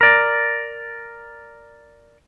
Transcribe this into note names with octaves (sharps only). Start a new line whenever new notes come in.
A#4 D5